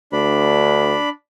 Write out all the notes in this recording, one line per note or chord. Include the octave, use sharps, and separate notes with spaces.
D2 D4 B5